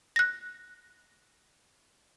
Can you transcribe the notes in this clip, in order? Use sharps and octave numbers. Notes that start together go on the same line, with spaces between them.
F#6 A#6